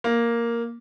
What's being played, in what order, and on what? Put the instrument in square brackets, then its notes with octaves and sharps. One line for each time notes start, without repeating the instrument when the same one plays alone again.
[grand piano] A#3